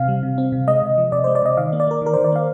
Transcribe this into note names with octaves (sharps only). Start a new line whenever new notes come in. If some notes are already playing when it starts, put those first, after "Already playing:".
Already playing: C3 C4 F5
G3
C3
C4
C3
G#3 D#5
C3
F3
C3 D5
C5
G#3
D5
C3 D#5
D#3 F5
A#3
D5
A#3 A#4
D#3 A#4
C5
D#3
D5
A#3 F5